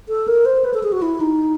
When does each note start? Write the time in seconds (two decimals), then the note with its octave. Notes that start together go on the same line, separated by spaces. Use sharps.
0.09 A4
0.28 A#4
0.46 C5
0.65 B4
0.74 A4
0.83 G#4
0.92 F#4
1.02 E4
1.21 D#4